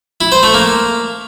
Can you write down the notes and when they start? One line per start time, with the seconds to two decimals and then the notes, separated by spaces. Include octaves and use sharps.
0.21 E4
0.32 C5
0.43 A3
0.54 A#3